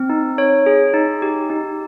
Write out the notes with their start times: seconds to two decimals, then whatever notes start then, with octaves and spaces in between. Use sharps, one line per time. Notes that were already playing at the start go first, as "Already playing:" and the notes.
Already playing: C4
0.10 D#4
0.38 C#5
0.66 G#4
0.94 D#4
1.22 G4
1.50 D#4